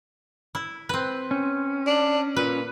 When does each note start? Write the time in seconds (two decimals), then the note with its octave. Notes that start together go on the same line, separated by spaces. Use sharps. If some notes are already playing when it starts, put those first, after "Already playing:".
0.55 E4
0.89 C4 B4
1.31 C#4
1.87 D4
2.36 A#2 B4